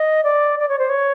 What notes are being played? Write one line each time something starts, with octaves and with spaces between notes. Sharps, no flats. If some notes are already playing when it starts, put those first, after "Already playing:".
Already playing: D#5
D5
D5
C#5
C5
C#5